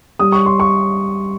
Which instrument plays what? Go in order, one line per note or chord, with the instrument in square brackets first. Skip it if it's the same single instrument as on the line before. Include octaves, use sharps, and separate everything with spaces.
[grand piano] G3 D#6
C#6
C6
C#6